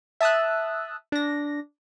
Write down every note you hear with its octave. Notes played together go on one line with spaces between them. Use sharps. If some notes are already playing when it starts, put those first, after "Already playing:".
E5 A5 D#6 E6 F#6
D4 A#6